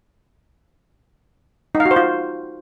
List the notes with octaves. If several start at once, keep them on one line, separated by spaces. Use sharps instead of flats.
D#4
F5
F#4
C5
F4